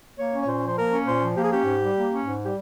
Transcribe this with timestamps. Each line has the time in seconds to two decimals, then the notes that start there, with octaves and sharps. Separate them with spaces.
0.17 A#3 C#5
0.32 C#4
0.43 C#5
0.46 A#2 C5
0.61 F3
0.68 C5
0.76 A#3 A#4
0.91 C#4
1.06 A#2 C5
1.21 F3
1.35 A#3 G4
1.43 G#4
1.51 C#4 G4
1.65 G#2
1.81 G3
1.95 A#3
2.10 C#4
2.25 G#2
2.40 G3 G4